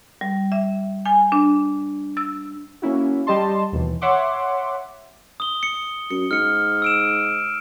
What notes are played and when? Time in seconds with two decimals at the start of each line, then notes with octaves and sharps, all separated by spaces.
0.21 G3
0.52 E5
1.05 G#5
1.32 D4
2.17 E6
2.82 A#3 C#4 E4 F#4
3.27 G3 G4 D#5 A5 C6
3.72 D#2 B2 E3
4.01 C#5 E5 F#5 C6 D6
5.40 D#6 G7
5.63 C#7
6.11 F#2 C#7
6.31 G#2 F6 C#7
6.82 E6 D7 E7